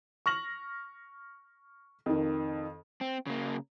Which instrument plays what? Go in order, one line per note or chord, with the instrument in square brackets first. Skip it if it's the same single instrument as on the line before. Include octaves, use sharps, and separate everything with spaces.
[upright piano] C#6 F6 A#6 F#7
F2 D#3
[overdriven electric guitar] C4
C#3 A#3